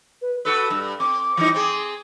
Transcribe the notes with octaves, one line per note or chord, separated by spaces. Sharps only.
B4
F#4 A4 B4 E6
G2
C4 D6
E3 G3 D#4
C4 G#4